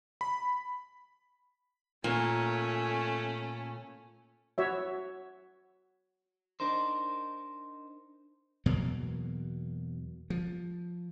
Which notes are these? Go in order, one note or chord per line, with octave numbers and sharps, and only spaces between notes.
B5
A#2 A3 C#4
F#4 C#5 E5
D4 D#4 A#4 C5
E2 B2 F#3 A#3
F3